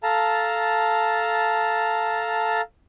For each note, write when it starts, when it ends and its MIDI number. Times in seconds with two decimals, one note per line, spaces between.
0.03 2.61 69
0.03 2.61 77
0.03 2.61 81
0.03 2.61 82